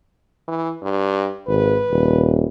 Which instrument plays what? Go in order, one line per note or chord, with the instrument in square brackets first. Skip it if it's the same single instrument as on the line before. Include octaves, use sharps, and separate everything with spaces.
[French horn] E3
G2
[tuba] G#1 [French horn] B4
[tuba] D#1